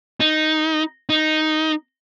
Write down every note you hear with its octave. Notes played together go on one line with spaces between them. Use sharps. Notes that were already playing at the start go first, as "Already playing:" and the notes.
D#4
D#4